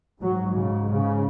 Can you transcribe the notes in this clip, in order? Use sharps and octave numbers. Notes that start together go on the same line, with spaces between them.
G#2 F#3
C#3
C#3